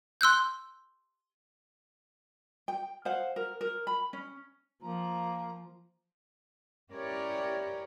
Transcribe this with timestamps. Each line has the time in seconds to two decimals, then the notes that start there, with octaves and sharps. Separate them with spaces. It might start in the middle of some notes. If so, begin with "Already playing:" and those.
0.21 C6 E6 F#6 G6
2.68 G5
3.05 C5 F5 F#5
3.36 A#4
3.61 A#4
3.87 B5
4.13 C#4
4.82 F3 A#3 A#5
6.91 C#4 E4 G4 A#4 C#5 D5